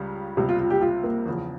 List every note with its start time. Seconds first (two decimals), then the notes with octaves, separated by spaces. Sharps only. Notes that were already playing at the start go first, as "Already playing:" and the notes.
Already playing: C#2 C#3 G3
0.37 C#2 C3 G3
0.49 F4
0.59 F4
0.70 G4
0.81 F4
1.04 A#3
1.26 E2 C#3 F3